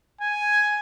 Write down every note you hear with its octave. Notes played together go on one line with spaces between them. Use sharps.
G#5